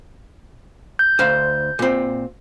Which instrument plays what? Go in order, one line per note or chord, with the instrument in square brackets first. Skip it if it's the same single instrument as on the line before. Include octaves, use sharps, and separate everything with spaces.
[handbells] G6
[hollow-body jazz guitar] D2 C5 F5
A#2 C4